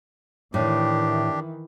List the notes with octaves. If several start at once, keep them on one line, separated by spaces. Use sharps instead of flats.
A2 D#3 E3 D4 G4